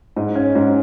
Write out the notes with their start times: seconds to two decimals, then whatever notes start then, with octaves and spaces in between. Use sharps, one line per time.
0.16 G#2
0.35 C#4
0.55 G#2